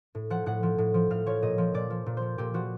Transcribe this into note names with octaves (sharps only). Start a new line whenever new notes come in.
A2
F3 F#5
A2 F#5
F3
A2
F3
A2 F5
F3 C#5
A#2 D#5
F3
A#2 D5
F3
A#2
C5
F3
A#2 G4
F3 F#4